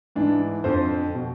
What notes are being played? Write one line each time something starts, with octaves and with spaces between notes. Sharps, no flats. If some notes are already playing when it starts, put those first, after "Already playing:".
G#2 E3 D4
F2 D3 F3 C5
B2